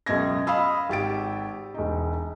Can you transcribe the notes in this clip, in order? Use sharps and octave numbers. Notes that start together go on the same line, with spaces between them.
C#2 F#2 B2 E5 G#6 A#6
D#5 F5 B5 D#6 E6
G#1 G4 A6 D7
E1 D#4